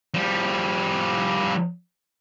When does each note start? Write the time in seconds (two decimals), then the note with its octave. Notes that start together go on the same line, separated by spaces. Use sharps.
0.14 F3 G3